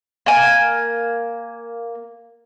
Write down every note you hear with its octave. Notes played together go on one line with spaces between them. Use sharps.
A#3 G#5